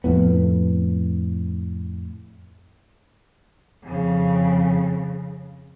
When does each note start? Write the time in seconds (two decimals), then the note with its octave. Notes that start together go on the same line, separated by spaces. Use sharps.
0.04 F2 A2 B3
3.83 F2 C#3